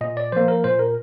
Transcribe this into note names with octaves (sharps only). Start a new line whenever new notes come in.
A#2 D#5
D5
F3 A#3 C5
A#4
A#2 C5
A#4